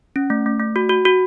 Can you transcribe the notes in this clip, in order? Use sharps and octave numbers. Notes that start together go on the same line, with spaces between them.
C#4
A3
A3
A3
F#4
F#4
F#4